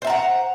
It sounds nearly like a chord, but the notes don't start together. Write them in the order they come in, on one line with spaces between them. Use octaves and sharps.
C5 E5 A#5 F#5